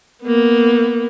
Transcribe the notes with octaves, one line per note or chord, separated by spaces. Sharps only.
A#3 B3